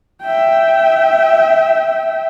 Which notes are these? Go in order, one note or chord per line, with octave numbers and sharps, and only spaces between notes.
E5 G5